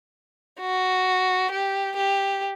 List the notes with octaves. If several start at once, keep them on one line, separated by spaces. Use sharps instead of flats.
F#4
G4
G4